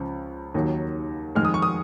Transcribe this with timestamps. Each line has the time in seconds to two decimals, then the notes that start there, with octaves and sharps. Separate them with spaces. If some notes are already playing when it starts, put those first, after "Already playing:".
Already playing: C#2 C#3 F3
0.54 D#2 D#3 F#3
1.35 F2 D#3 G#3 F6
1.45 D#6
1.54 C#6
1.62 D#6